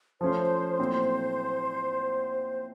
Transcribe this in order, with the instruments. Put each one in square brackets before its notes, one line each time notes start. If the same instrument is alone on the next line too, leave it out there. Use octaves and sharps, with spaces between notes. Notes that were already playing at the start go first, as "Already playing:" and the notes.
[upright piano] F3 A3 C#4 F4 [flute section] C5
[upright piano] A#2 F#3 A3 C4 E4